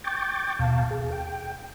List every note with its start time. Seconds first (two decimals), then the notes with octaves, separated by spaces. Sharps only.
0.04 G5 C#6 D6 G6 A6
0.59 D#2 B2 F5 A5
0.91 G#4
1.12 G5